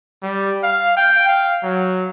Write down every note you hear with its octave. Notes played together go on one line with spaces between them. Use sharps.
G3
F5
G5
F5
F#3